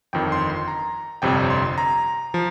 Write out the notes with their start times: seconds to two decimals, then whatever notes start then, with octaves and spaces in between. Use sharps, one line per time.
0.13 G1 F2 D#3 G5
0.32 C6
0.50 C6
0.68 A#5
1.22 G1 F2 C3 G3 G5
1.50 C6
1.78 A#5
2.34 F3